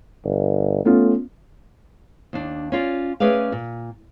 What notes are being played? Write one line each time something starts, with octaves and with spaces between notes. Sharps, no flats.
G1
A3 B3 C#4 F4
D#2 D4
C#4 F4 D5
A3 C#4 G#4 B4 D5 F5
A#2